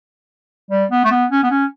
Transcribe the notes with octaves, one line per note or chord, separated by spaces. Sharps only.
G3
B3
A3
B3
C#4
B3
C#4